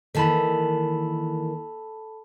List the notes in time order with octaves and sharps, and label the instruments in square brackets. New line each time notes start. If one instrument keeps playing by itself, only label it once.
[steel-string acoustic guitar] D#3 E3 A#3 [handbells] A4 A5 B5